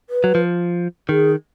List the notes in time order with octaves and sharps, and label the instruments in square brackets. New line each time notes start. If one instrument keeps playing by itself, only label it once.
[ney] B4
[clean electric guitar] F#3
F3
[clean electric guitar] D#3 [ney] G#4